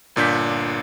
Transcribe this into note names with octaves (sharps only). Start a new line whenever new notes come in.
G1 A#2 D4 G6 B6